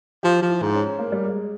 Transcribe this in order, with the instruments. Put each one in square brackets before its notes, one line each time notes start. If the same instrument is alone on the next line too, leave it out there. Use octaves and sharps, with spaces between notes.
[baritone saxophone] F3 [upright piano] G4
[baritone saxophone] F3
[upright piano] E4
[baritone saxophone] G#2
[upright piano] C#4
A#3
G3
G#3